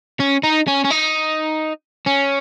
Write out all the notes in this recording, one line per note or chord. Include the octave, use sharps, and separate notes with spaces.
C#4
D#4
C#4
C#4
D#4
C#4